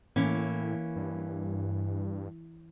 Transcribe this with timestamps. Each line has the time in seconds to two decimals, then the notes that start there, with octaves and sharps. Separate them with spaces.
0.16 A2 E3 A#3 C#4
0.96 G2